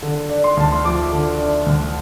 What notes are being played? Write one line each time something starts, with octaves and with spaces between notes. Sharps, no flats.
D3
D4
C6
D2 A5
C6
F3 D6
D3
D4
D2